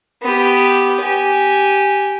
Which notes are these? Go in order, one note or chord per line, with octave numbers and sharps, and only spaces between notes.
B3 G4
G4 G#5